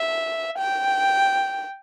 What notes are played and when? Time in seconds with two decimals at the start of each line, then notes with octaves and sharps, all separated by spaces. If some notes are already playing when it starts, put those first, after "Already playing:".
Already playing: E5
0.58 G5